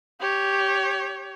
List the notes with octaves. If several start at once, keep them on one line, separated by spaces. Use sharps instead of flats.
G4 C#5